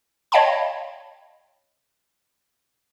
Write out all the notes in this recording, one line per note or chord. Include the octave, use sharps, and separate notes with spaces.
C#5 D#5 F5 G5 A5 B5